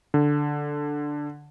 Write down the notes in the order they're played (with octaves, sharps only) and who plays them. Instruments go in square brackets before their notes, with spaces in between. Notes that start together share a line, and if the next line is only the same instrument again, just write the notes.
[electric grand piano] D3